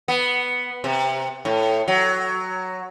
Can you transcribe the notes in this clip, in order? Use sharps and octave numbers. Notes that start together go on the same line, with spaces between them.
B3
C3
A2
F#3